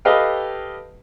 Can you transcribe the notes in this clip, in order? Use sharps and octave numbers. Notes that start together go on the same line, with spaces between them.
G4 A4 B4 D#5 F5 G5